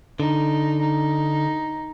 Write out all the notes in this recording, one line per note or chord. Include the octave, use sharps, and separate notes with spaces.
D3 D#4
D#4